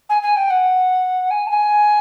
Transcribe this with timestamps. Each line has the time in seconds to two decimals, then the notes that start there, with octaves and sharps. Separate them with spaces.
0.09 G#5
0.22 G#5
0.36 G5
0.50 F#5
1.30 G#5
1.46 A5
1.50 G#5